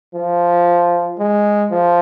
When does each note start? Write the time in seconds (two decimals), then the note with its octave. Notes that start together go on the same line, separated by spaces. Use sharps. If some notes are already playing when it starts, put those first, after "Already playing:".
0.14 F3
1.18 G#3
1.71 F3